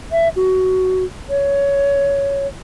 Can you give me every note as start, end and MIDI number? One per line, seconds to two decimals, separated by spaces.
0.12 0.28 76
0.36 1.04 66
1.30 2.47 73